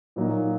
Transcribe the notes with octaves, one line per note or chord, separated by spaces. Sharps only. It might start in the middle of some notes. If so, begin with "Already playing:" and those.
A#2 F#3 A#3 D#4